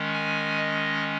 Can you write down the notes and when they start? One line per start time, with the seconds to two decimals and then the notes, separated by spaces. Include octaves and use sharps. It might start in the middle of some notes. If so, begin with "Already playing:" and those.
Already playing: D#3 G#3 C#4
0.13 G#5
0.58 D#5